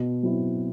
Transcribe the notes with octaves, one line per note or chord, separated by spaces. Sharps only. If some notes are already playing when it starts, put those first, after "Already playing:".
Already playing: B2
F#3 C4 E4